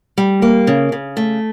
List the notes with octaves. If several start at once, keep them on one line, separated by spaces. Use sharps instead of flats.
G3
A#3
C#3
C#3
A3